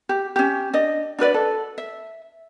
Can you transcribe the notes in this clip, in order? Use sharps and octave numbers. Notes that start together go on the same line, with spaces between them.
G4
C#4 G4
D4 D#5
D4 F#4 B4 D5
A4
E5